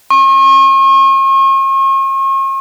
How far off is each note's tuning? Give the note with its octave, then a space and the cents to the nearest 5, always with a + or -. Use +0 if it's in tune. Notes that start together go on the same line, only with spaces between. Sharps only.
C#6 -40